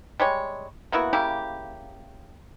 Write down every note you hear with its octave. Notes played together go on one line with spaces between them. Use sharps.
G3 G#3 C#5
A#3 B3 E4 F#4
C#3 A#3 E4 G4